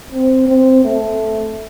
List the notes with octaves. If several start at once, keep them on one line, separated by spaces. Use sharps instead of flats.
C4
C4
A3